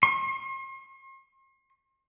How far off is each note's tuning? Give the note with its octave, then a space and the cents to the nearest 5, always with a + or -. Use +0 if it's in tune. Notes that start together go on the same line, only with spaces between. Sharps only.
C6 +45